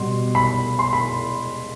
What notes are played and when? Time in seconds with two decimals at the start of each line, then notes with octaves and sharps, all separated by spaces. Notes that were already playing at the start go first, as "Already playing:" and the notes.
Already playing: B2 G3 C6
0.35 B5
0.79 C6
0.93 B5